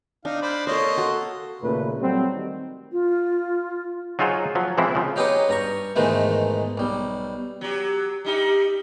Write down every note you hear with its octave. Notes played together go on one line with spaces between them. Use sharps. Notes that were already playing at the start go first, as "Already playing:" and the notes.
D4 D#4 F5
C5 D5 B5
A#3 A4 C#5 D#5 C6
F#4 A4
D#2 A#2 C#3 A3 B4
F#3 G3 A3 C4
D#3
F4
F#3 D#4 F4 G#4 C5 C#5
F3 F#3
E3 F3 G#3 C4 E4
C#3 F3
F#3 D#4 G4 G#4 B4 C#5
G2 A#5 C#6
G#2 B2 D#3 E3 G#3 A3
B1 G3
F#3 G4
G3 D#4 G4